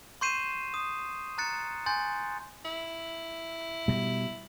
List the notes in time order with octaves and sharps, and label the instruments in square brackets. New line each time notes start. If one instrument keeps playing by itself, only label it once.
[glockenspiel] C6 C#6 G6 C7 D#7 E7
D#6
A#5 F#6 A6 C#7
G#5 C6 G6 A6
[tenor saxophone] E4
[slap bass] B2 G3